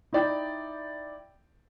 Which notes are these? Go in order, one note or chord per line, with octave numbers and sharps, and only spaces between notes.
D#4 E4 D5 G5